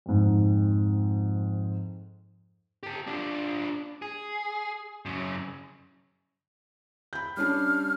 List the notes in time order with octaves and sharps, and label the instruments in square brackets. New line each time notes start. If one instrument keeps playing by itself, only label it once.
[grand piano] F2 G#2
[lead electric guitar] G4 A4
D4 F4
G#4
F#2 C#3
[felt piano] B5 G6
[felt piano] G3 C#4 D4 [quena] F6